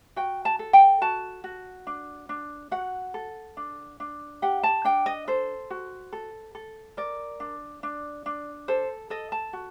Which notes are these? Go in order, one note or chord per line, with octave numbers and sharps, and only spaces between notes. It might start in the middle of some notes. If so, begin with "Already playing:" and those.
F#4 G5
A5
A4
G5
F#4 A5
F#4
D4
D4
F#4 F#5
A4
D4
D4
G4 F#5
A5
D4 G5
D#5
A4 C5
F#4
A4
A4
A#4 D5
D4
D4
D4
A4 C5
A4 D#5
A5
F#4